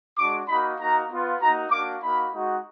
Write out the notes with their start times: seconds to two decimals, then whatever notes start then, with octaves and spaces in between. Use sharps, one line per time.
0.18 G#3 D4 F#4 D6
0.48 A#3 D#4 F#4 B5
0.80 A#3 D#4 F#4 A#5
1.11 B3 F4
1.41 A#3 D#4 F#4 A#5
1.71 A#3 D4 F#4 D6
2.02 A#3 D#4 F#4 B5
2.33 G#3 D#4 F#4